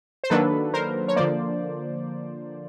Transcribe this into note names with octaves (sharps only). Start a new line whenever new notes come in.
C5
D#3 F#3 A#3 D4 A4 B4
A#4 C5
C#5
D3 F3 A#3 C5 D5